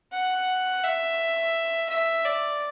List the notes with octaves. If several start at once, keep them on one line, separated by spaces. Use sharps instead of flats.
F#5
E5
E5
D5